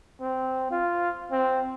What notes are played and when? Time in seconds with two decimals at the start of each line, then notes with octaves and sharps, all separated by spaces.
0.21 C4
0.71 F4
1.32 C4